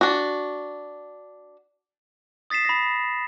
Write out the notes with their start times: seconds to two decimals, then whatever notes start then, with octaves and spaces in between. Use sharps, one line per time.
0.01 D4 F#4
2.50 D#6 A6 B6 C7 E7
2.65 B5 A#6